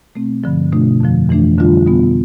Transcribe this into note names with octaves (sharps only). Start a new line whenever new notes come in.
B2 A3 C4
G2 D3 F3
B2 A3 D4 F4
F2 D3 F3
F2 E3 A3 D4
F2 D3 G3 D4 F4
B2 G3 B3 F4